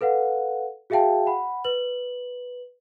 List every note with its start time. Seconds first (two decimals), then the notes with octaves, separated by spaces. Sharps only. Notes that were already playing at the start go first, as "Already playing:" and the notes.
0.01 A4 B4 F5 F#5
0.90 F#4 G#4 E5 F5 G5 A5
1.27 F#5 B5
1.64 B4 F#7